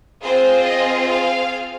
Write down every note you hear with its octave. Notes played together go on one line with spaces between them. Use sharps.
C4 F4 G#4 C5
D#5
F5